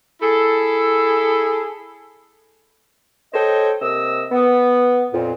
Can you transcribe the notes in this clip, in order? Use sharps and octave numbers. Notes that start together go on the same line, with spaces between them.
E4 G#4 A4
A4 C5 C#5 D#5 G5
C3 A#3 D#5 E6
B3
F2 A#2